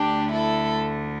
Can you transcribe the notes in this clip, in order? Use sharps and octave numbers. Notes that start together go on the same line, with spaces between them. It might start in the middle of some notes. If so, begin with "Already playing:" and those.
Already playing: D2 D3 A3 D4 G4
E4 A4